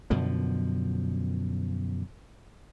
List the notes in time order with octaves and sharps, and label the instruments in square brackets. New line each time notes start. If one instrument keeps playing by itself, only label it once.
[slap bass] F#2 B2 D3 F3